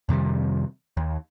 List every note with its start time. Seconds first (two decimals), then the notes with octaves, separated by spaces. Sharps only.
0.09 F2 C3 D#3 G3
0.97 D#2